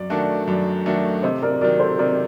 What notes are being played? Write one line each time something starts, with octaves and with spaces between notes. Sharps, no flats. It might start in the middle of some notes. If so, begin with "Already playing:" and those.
Already playing: F#2 D5
D#3 A3 D4 F#4
F#2
D#3 A3 D4 F#4
C3 C5 D#5
A#4 D5
D#3 F#3 A#4 D5
A4 C5
C3 A#4 D5